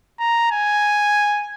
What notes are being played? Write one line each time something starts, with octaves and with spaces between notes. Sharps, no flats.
A#5
G#5